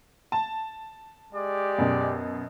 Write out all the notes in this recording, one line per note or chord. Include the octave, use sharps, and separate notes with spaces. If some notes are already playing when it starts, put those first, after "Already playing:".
A5
G#3 G4 D5
F#2 B2